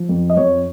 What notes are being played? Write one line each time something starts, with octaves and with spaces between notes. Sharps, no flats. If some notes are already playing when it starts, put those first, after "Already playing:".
Already playing: F3
F2
D#5
F2 C#5